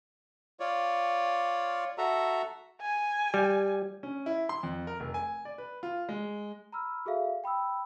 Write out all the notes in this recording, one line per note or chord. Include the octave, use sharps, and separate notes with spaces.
F4 C#5 D5
F#4 A4 E5 A#5
G#5
G3
C#4
E4
C6
F2
A#4
F1
G#5
D5
B4
F4
G#3
A#5 B5 E6 F6
F#4 G#4 A4 E5 F5
G5 B5 D#6 E6